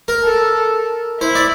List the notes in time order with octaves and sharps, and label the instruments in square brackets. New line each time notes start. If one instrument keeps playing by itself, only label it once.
[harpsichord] A#4
[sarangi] A4
[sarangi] E4 [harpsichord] C5
[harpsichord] D5